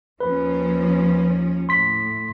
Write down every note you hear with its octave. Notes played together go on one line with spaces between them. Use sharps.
D#2 F3 C#4 B4
A2 C6 B6